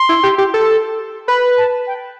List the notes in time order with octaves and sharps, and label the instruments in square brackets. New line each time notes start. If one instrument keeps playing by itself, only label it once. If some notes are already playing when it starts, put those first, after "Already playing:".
Already playing: [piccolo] C6
[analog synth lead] E4
G4
G4
A4
[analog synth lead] B4 [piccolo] B5
[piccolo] A5
G5